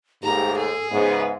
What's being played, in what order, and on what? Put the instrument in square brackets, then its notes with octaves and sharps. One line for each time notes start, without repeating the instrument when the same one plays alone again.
[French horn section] D#2 A3 [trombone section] G#2 [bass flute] G4 [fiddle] A#5
[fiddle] G#4 [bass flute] A4
[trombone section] G#2 [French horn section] C#3 G#3 B3 [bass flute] E5